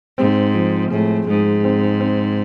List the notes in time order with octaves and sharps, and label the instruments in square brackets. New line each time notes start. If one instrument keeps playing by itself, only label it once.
[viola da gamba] G#2 [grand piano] C4
[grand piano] F3
[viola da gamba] A2 [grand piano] G#3
[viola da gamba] G#2 [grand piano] G#3
[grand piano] C4
C4